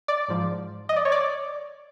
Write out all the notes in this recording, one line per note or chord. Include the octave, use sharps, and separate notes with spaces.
D5
G#2 F3
D#5
D5
C#5
D5